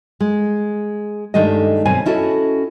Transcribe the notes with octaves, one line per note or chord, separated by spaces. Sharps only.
G#3
G2 D#3 G#3 A3 G4 D#5
F#2 B2 C4 B4 G#5
C#4 E4 F#4 A4 D#5